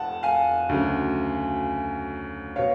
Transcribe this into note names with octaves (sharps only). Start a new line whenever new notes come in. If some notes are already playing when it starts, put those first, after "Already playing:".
Already playing: F1 F2 F#5 A5
F5 G#5
D2 C#3 F#3
B2 C#5 F5